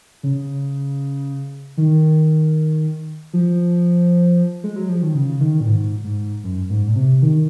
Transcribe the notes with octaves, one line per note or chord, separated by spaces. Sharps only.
C#3
D#3
F3
G#3
F#3
F3
D#3
C#3
D#3
A#2
G#2
G#2
F#2
G#2
A#2
C3
D#3